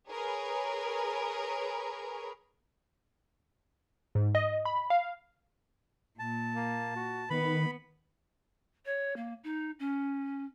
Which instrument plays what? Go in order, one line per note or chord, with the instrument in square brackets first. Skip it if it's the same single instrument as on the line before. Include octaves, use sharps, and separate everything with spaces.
[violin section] G#4 A#4 B4 C#5
[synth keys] G#2
D#5
B5
F5
[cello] A#2 [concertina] A5
[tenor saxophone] A#3
F#4
[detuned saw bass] D#3 [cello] B3 [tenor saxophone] B4 [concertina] B5
[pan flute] C#5
A#3
D#4
C#4